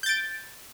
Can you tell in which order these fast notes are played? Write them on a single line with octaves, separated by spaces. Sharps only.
G6 A6 D7